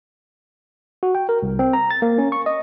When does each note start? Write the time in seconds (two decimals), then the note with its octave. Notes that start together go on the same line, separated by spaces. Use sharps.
1.03 F#4
1.15 G5
1.29 A#4
1.43 C2
1.59 C4
1.73 A#5
1.91 A6
2.02 A#3
2.18 C#4
2.32 C#6
2.46 D#5